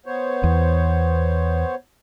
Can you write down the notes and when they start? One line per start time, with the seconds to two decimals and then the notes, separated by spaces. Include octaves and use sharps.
0.06 B3 C5 C#5
0.44 E2